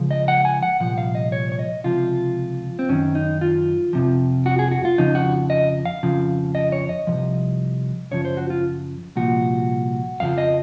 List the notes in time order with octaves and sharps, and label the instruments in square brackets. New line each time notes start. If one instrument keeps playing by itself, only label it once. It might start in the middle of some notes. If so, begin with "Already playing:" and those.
Already playing: [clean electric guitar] C#2 C#3 F3
D#5
F#5
G#5
F#5
C2 A#2 F3 F#5
F5
D#5
C#5
C#5
D#5
C#2 C3 F3 F4
C4
F#2 D#3 C#4
D#4
F4
F2 C3 F3
F#4
G#4
F#4
F4
F2 C#3 F3 D#4
F#4
D#5
F5
F2 C#3 F3
D#5
C#5
D#5
A#2 F3
C2
F#2 C#3 F3 C#5
C5
F#4
F4
C2 A#2 F3 F#4
F2 C#3 F3 F5
D#5